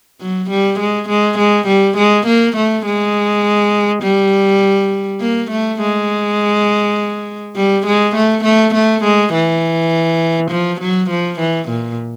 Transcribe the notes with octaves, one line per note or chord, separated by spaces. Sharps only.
F#3
G3
G#3
G#3
G#3
G3
G#3
A#3
A3
G#3
G3
A#3
A3
G#3
G3
G#3
A3
A3
A3
G#3
E3
F3
F#3
F3
E3
A#2